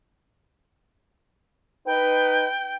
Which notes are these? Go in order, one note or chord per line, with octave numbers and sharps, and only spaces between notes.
D#4 B4 G5